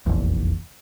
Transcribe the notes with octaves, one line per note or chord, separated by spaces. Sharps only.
F1 A#1 E2